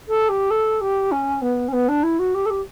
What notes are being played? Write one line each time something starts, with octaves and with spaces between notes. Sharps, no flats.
A4
G4
A4
G4
C#4
B3
C#4
B3
D4
E4
F#4
G4
A4
G4